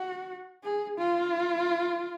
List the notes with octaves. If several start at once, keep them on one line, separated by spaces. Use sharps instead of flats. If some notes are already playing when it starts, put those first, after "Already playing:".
Already playing: F#4
G#4
F4